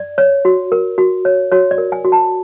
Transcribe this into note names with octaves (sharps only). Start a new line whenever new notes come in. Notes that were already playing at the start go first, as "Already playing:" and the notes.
Already playing: D5
C#5
F#4
A#4
F#4
C#5
F#4 C#5
D5
A#4
G#5
F#4
A5